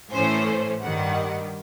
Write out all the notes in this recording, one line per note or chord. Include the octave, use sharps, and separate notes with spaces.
A2 E3 A3 C#4 C5
G2 D#3 G3 F#5